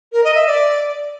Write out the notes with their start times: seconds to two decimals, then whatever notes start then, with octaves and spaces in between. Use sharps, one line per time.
0.12 A#4
0.24 D#5
0.35 E5
0.47 D5